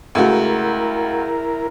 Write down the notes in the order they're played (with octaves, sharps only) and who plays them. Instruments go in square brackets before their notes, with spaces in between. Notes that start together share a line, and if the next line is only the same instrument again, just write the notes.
[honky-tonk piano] C#2 A3 F#4 [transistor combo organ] E4 A#4